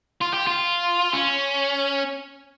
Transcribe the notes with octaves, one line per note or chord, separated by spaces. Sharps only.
F4
G4
F4
C#4